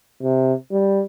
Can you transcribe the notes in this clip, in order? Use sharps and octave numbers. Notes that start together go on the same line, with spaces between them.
C3
G3